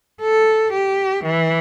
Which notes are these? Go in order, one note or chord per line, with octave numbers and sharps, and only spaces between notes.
A4
G4
E3